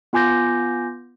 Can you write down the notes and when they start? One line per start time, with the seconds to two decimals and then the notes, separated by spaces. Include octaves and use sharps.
0.13 B3 F4 G#5 D6 G6 A#6